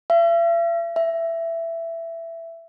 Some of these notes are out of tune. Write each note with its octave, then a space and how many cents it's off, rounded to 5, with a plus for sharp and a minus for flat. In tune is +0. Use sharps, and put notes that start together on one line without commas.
E5 +45
E5 +15